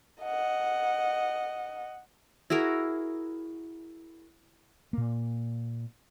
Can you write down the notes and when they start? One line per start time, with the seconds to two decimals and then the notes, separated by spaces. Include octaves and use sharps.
0.22 D#5 F#5
2.50 E4 F#4 G#4 A#4
4.93 A#2 A#3